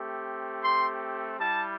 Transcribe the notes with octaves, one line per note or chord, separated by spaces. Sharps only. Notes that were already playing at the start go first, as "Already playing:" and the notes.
Already playing: A3 C4 G4
C6
G3 E4 G4 A5